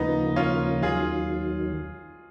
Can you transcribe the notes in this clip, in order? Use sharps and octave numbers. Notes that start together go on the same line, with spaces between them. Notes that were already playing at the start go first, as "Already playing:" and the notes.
Already playing: D#2 C#3 F3 A#3 B3 D#4
C#4 F4
D#2 D#3 F#3 F4 G#4